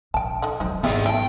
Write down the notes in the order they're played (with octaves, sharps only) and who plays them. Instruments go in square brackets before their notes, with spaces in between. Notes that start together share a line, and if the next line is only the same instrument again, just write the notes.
[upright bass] A#1 [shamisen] G5 A5
[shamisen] D#4 A4 F#5
[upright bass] F#3 F4 [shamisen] D#4 C5
[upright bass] G#1 [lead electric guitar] B3 G#4 [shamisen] E4 G4 D#5
[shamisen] E4 A4 A5 [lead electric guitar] G5